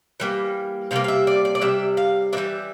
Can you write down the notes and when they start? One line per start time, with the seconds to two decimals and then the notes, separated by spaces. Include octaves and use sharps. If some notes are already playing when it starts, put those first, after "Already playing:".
0.20 E3 G3 A#3
0.91 C3 G3 A#3 F5
1.04 F5
1.08 E5
1.27 D5
1.45 D5
1.55 D5
1.61 C3 G3 E5
1.97 F5
2.33 A#3 D4 E5
2.37 E3 G3